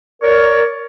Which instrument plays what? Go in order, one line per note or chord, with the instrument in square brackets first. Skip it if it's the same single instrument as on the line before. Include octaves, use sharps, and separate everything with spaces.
[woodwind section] A#4 C#5 D5